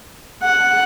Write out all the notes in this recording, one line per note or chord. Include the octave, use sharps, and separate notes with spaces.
F#5